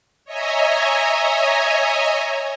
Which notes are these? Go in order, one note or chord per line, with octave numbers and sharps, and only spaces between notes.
C#5 D#5 E5 G#5 A#5